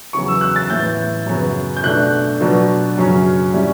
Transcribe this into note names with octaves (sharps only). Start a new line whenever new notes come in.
E2 C#3 F#3 B3 C#6
E6
F#6
A6
A2 E3 B3 G6
F#2 C#3 F#3 B3
G6
B2 A3 D4 F#6
B2 F#3 B3 D4
F#2 C#3 F#3 C#4
A2 G3 C#4